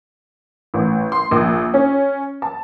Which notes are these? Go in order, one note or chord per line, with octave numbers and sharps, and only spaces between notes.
A1
C6
A#1
C#4
A5